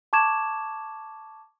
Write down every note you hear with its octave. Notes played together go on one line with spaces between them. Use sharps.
A5 C#6 D6 G#6 E7